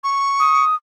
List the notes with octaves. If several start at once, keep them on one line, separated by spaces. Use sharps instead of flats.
C#6
D#6